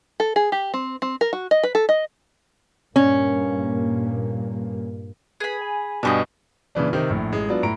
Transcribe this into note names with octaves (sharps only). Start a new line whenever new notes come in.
A4
G#4
G4
C4
C4
A#4
F#4
D#5
B4
A4
D#5
G2 A#2 A#3 C#4
G#4 B4 B5
G#5
G2 B2 D4 G4 D#5
A#2 C#3 E3 D4
C3 D#3 C4
A#1 A2
A1 G#3
F#3 B3 D4 F4
A2 A#5 D7